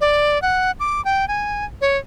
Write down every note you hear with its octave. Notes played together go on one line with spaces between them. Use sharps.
D5
F#5
D6
G5
G#5
C#5